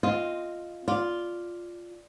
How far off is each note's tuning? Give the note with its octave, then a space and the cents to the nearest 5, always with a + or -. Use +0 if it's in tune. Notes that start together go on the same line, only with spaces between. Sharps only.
C4 +10 F4 -5 D#5 +0
F4 +0 D5 +0